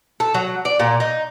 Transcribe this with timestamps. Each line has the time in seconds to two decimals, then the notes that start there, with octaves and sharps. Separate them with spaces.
0.20 A4
0.34 F#3
0.65 D5
0.80 A#2
1.00 D#4